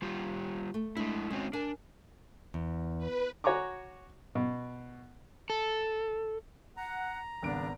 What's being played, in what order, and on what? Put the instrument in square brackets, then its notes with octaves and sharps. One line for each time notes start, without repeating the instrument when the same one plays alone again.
[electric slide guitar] G3 F4 G4
[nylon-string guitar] A3
[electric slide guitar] G#3 E4 [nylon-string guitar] D4
[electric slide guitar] G#3 C4 F#4 [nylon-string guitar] C#4
[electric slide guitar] D4 [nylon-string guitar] A#4 G#5
[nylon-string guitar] E2
[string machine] B4
[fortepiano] F#4 C#5 G#5 A#5 C#6 D6
B2
[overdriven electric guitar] A4
[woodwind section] F#5 [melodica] A#5
[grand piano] G#1 B3 D7 [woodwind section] C#3 G3 D4